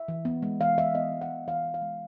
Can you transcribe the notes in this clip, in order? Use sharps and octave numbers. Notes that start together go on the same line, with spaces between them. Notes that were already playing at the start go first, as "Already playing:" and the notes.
Already playing: E5
E3
B3
G#3
E3 F5
E3 E5
B3 D#5
G#3
F#5
E3
E3 F5
B3
F5
G#3